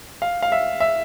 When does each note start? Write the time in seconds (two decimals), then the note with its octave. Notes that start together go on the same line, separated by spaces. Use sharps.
0.22 F5
0.42 F5
0.52 E5
0.80 E5